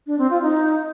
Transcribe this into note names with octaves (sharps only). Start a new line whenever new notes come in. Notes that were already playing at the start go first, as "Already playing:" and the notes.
D4
C4
F4
D#4